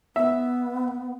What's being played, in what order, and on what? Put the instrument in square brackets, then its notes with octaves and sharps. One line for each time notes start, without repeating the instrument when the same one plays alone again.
[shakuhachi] B3 [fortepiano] E5